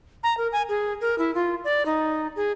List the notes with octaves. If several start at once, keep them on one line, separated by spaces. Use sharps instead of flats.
A#5
A#4
G#5
G#4
A#4
E4
F4
D5
D#4
G#4